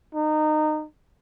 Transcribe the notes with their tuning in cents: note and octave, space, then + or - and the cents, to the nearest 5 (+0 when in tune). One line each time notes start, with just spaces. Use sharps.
D#4 -20